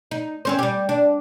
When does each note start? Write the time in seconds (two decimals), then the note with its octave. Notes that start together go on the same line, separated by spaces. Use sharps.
0.11 D#4
0.45 C4 C#4 C5
0.59 G3 G4
0.89 D4